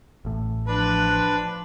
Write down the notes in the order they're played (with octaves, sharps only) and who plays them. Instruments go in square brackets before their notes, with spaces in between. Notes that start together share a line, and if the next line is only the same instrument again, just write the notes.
[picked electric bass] A1 A2
[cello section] F3 [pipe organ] D4 [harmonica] B4